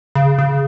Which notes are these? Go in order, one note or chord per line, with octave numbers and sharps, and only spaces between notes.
C#3
C#3